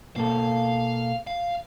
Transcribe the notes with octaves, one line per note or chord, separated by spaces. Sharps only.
B2 A#3 A4 F5
F5